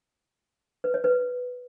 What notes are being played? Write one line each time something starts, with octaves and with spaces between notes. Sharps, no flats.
B4
C#5
B4